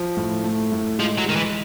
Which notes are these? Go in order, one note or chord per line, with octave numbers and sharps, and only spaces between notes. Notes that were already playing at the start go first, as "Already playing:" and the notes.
Already playing: F3
A2
A3
A2
F3 G#3
F#3
D#3 G#3
E3